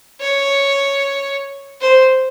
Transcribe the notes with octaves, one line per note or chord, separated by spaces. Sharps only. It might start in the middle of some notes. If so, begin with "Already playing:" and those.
C#5
C5